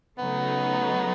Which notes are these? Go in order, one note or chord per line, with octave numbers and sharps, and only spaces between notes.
C#3 F#3 A3 B3 D#4